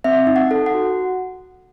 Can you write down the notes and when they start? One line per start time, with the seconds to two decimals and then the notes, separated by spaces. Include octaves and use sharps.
0.04 C4 E5
0.27 D#4
0.36 F#5
0.51 A4
0.66 F#5
0.74 F#4